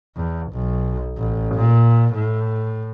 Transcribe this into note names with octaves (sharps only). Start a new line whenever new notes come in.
E2
B1
A1
A#2
A2